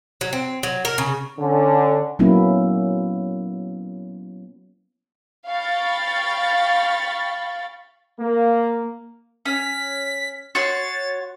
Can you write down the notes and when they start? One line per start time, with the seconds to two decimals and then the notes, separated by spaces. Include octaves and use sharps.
0.21 F#3
0.33 C4
0.63 F#3
0.85 A#4
0.98 C#3
1.39 D3 C#4
2.19 F#3 A#3 B3 C#4 E4
5.48 F5 G5 B5 C#6 A6
8.21 A#3
9.46 C#4 B6
10.55 F#4 C#5 C6 A6